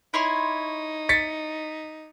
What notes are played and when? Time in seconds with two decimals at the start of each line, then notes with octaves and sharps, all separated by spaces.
0.14 D#4 E4 C#5 C6
1.09 A6 B6 C#7